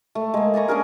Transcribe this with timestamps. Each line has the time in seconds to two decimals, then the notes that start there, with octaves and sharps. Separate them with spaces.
0.15 A3
0.34 G#3 A#3
0.54 D5 G#5 A#5 C#6
0.68 C#4 D4 G#4 A#4